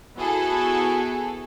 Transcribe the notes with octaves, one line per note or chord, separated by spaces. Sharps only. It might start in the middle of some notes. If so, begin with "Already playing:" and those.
B3 E4 F#4 G#4 A4